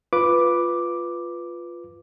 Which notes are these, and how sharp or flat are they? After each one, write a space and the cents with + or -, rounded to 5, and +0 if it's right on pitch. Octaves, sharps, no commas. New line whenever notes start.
F4 +0 B4 +0 D6 +0